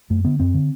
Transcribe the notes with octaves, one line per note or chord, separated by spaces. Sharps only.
F#2 A3
D3 B3
F#2 C4
D3